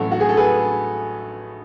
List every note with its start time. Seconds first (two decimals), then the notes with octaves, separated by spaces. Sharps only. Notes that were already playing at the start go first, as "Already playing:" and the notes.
Already playing: A1 A2 F#3 A3 F#4 A4
0.12 F#4
0.20 G#4
0.29 A4
0.37 G#4 B4